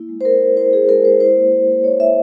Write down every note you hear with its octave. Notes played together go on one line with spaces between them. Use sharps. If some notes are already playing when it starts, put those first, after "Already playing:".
Already playing: A#3 E4
G#3
C5
E4 A#4
E4
E4 C5
E4 G#4
G#3 A#4
G#3 C5
E4 C5
A#3
E4
A#3
E4 C#5
E4 E5